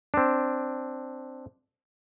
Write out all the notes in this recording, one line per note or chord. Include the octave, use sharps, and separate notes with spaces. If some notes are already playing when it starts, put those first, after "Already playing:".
C4 D4